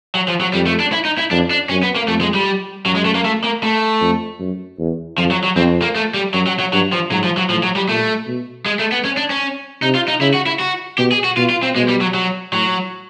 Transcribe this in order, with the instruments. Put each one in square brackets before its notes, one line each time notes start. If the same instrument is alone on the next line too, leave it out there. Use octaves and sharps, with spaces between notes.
[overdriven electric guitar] F#3
F3
F#3
[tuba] F2 [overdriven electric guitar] G3
[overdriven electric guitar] A3
D4
E4
D#4
E4
[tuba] F2 [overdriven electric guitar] D4
[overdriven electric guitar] D4
[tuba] F#2 [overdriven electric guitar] C#4
[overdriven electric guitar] B3
A#3
[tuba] F2 [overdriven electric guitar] A3
[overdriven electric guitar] G#3
G3
[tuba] F#2 [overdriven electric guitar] F#3
[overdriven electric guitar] G#3
A3
A#3
A3
A#3
A3
[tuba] F2
F#2
E2
[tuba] F2 [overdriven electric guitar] F3
[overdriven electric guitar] F#3
F#3
[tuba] F2 [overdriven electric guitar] C4
[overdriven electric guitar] A#3
A3
G3
[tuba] F#2 [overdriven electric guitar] F#3
[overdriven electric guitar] F#3
F#3
[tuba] G2 [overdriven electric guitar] F#3
[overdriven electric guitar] F3
[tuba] G#2 [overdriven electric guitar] F#3
[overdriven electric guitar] F3
F#3
[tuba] A2 [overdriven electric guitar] F3
[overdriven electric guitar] F#3
G3
[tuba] A#2 [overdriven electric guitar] A3
[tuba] B2
[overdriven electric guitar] G#3
A3
B3
C#4
D4
C#4
[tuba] C3 [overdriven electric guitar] D#4
[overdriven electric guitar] F4
D#4
[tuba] C#3 [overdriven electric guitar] E4
[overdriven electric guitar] F#4
E4
F#4
[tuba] B2 [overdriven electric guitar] G4
[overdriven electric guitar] G#4
F#4
[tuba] B2 [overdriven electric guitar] F4
[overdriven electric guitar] F4
C4
[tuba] B2 [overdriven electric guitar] G#3
[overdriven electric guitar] G3
F#3
F#3
[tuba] A2 [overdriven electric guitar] F#3